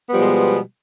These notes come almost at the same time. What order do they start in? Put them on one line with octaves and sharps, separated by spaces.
B3 G3 F3 B2 G#3